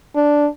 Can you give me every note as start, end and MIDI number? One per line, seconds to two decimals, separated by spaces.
0.15 0.47 62